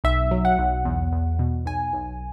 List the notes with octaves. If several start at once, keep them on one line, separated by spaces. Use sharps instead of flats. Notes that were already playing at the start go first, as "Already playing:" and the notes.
B1 E5
F#3
F#5
B1
E2
E2
B2
B1 G#5
B1